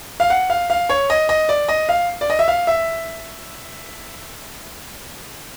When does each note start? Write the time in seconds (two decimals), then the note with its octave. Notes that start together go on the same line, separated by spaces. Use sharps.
0.20 F5
0.30 F#5
0.50 F5
0.70 F5
0.89 C#5
1.10 D#5
1.29 D#5
1.49 D5
1.68 D#5
1.89 F5
2.21 D5
2.30 D#5
2.39 E5
2.48 F5
2.67 E5